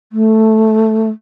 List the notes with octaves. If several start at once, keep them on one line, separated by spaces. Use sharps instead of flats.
A3